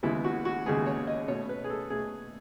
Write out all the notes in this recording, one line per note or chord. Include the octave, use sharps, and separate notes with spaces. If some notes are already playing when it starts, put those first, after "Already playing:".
D#2 C#3 G#3 B3 E4
F#4
F#4
D#2 C#3 G#3 B3 G#4
C#5
D#5
B2 A3 C#5
B4
G#4
A4
B2 A3 G#4